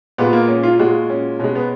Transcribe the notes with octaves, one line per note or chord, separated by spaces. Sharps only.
A#2 G#3 B3
A#3
C#4
F4
A#2 G#3 F#4
C#4
B2 G#3 C#4
B3